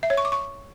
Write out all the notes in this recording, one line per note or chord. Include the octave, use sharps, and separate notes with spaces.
E5
C#5
C#6
D6
C#6